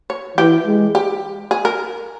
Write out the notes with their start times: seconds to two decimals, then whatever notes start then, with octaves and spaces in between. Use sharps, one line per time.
0.10 C#5
0.38 E3 G4
0.67 G#3
0.95 G4
1.51 G#4
1.65 A#4